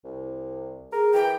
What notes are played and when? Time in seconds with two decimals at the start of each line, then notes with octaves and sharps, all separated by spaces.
0.04 C2
0.92 G#4 A#4
1.14 E3 G5